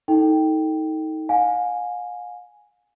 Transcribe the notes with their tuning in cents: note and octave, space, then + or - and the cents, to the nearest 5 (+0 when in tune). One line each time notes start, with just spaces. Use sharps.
D#4 +25 A4 +0 G5 +0
F5 +45 G#5 +0